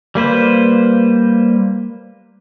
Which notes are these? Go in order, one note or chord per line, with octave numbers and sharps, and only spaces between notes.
G3 A#3 B4 C5